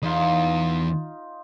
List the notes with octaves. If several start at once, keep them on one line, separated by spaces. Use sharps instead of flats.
E2 D#4 F4